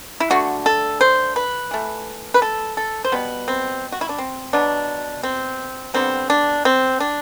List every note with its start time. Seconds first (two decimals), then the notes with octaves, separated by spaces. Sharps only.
0.20 E4
0.30 D3 A3 F#4
0.66 A4
1.01 C5
1.36 B4
1.71 E3 A3
2.34 B4
2.42 A4
2.77 A4
3.05 C5
3.12 B2 G3 B3 B4
3.48 C4
3.92 F#4
4.01 E4
4.09 D4
4.19 C4
4.53 B2 F#3 B3 D4
5.23 C4
5.94 D3 G3 B3 C4
6.30 D4
6.65 C4
7.00 D4